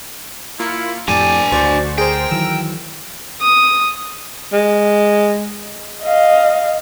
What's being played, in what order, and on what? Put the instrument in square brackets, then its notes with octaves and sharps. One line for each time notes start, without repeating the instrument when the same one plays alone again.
[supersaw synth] A#3 F4 C#7 [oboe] E4
[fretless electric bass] F2 A2 [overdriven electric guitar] D4 G#5 [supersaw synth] G4 A5 G#6 [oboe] D5
[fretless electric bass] D2 D3 [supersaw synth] F#4 C5 C#6 [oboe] D5
[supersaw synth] G#4 C5 [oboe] A#4 [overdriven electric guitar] G5
[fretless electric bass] D#3 E3 F#3 [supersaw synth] E6
[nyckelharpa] D#6
[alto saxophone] G#3
[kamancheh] D#5 F5